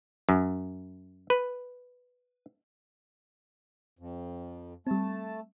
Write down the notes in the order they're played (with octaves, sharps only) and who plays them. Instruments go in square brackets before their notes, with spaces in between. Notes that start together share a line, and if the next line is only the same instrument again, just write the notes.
[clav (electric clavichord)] F#2
B4
[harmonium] F2
[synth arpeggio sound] G3 C4 [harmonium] A3 A5